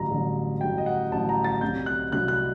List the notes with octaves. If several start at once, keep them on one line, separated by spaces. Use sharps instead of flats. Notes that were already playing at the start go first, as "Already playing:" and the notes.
Already playing: A1 G2 D3 F#3 A#5
A1 G2 D3 F#3
A1 G2 D3 F#3 G5
D#5
F#5
A1 G2 D3 F#3 A5
A#5
A6
C2 C3 F#3 G6
F#6
C2 C3 F#3 F#6
F#6